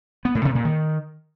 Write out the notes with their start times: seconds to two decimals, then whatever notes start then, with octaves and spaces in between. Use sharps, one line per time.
0.25 B3
0.35 A2
0.45 C3
0.55 A#2
0.65 D#3